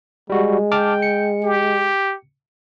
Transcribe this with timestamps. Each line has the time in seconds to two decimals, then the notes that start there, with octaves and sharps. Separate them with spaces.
0.30 G3 G#3 F#4
0.72 G5 A5 D6 F6
1.02 C#7
1.43 G4